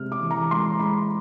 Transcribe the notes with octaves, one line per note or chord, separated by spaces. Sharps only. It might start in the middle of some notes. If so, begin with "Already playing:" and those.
Already playing: C3 G#3 F6
D6
E3
A#5
G#3 C6
G#3 B5